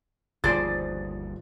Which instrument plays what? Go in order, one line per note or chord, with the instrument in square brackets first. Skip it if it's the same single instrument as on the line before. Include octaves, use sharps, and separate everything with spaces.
[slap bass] G1 D#2 [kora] F3 G#4 D5 [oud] C5 [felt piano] A6